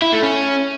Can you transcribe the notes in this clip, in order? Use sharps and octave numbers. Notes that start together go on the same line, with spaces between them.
E4
A3
C#4